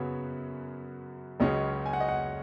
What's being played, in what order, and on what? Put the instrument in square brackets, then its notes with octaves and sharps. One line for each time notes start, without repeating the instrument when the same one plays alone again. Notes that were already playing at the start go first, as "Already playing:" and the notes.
Already playing: [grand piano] F#2 C#3 F#3 B3 C#5
C#2 C#3 F#3 C#4 D#5
G#5
F#5
D#5
F#5